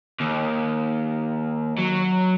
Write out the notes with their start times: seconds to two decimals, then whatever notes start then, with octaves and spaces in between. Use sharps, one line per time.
0.20 D#2
1.78 F#3